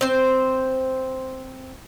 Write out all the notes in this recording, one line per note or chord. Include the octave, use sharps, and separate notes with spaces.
C4 C5